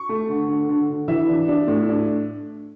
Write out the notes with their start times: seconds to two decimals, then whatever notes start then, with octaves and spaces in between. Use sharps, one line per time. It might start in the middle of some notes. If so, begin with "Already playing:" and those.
Already playing: C#6
0.09 A3
0.29 D3
0.48 D3
0.69 D3
0.89 D3
1.08 E3 E5
1.28 D4
1.48 D4
1.68 A2
1.88 D4